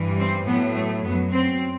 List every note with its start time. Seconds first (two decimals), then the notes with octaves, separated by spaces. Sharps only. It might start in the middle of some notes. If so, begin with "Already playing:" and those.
Already playing: G2 E3 G3
0.19 C4
0.47 A2 F#3 B3
0.75 A3
1.03 F#2 F#3 B3
1.32 C4